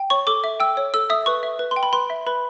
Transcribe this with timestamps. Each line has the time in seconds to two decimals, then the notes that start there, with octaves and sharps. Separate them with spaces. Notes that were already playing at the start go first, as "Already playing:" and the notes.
Already playing: G5
0.10 C#5 C#6
0.27 A4 D6
0.44 E5
0.60 G5 E6
0.77 C#5
0.94 A4 E6
1.10 E5 D#6
1.26 B4 C#6
1.43 E5
1.59 B4
1.71 C6
1.76 G5
1.83 B5
1.93 B4 C6
2.10 E5
2.27 B4 B5